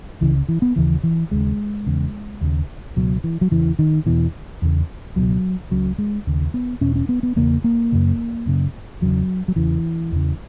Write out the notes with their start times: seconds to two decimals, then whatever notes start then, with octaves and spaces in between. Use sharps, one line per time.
0.21 C#2 C#3 E3
0.49 E3
0.62 B3
0.76 D#2 C#3 E3
1.03 E3
1.31 D#2 C#3 G#3
1.86 E2 C#3
2.41 D#2 C#3
2.96 C#2 B2 F#3
3.24 E3
3.41 F#3
3.51 E2 C#3 E3
3.79 D#3
4.06 E2 B2 E3
4.62 E2 C#3
5.16 C#2 B2 F#3
5.71 C#2 C#3 F#3
5.98 G#3
6.27 D#2 C#3
6.54 B3
6.81 E2 B2 C#4
6.96 C#4
7.09 B3
7.23 B3
7.36 E2 C#3 A#3
7.64 A#3
7.92 F#2 C#3
8.46 F#2 C#3
9.01 E2 C#3 F#3
9.48 F#3
9.56 E2 C#3 E3
10.12 E2 C#3